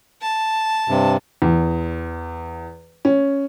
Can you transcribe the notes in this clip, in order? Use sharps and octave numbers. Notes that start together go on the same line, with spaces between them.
A5
G2 C3
E2
C#4